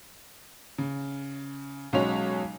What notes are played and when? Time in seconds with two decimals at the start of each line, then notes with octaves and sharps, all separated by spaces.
0.78 C#3
1.93 B1 F#3 G#3 C#4 C#5 F7